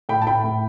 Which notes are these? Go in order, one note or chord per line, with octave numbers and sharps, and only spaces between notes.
A2 G5 B5
A5
A2 G5 B5
A2